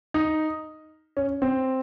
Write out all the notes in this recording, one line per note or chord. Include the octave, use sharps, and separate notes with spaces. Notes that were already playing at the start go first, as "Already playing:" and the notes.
D#4
C#4
C4